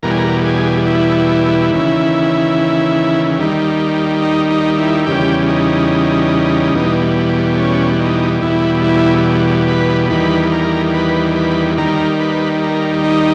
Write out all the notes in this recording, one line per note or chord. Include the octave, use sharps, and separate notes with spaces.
E2 B2 G3 A#4
G#4
A#4
G#4
E4
D#2 C#3 E3
D#2 D#3 G3
D#4
D#4
E4
E2 C#3 G3 G4
D#4
E2 B2 G3
C#4
D#4
E2 B2 G3 E4
E4
B4
E2 D#3 G3 B4
A#4
B4
B4
D#2 D#3 G3 A#4
B4
A#4
D#4